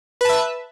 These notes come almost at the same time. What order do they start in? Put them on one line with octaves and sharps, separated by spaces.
B4 A5 E5